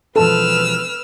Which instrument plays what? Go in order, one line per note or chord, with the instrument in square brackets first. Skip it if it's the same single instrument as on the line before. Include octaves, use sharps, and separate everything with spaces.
[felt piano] E1 F3 A5 [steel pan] A4 [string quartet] B4 E6 F6